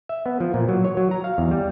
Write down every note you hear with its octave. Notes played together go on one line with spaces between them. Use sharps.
E5
B3
F3
A#2
F#3
C#5
F#3
A#5
F5
E2
G3